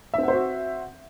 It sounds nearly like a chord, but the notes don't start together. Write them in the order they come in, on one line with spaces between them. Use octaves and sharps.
E5 C4 F#5 C5 F#4